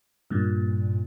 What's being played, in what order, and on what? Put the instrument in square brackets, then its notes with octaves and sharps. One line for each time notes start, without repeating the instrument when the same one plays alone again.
[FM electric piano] G2 A#2